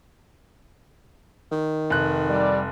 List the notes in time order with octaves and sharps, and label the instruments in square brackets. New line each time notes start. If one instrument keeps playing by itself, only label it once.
[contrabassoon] D#3
[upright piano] F1 F#6
[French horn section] G3 D5